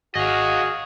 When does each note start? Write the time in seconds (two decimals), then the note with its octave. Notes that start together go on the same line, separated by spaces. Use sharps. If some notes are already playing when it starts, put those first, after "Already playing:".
0.15 G#1 F#4 G#4 D#5 F5